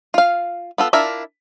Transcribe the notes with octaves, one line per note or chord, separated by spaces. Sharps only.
F4 F5
B3 F4 A4
D4 E4 F4 A#4 E5